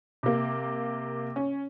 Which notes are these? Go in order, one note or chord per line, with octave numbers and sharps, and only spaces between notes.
C3 A#3
C#4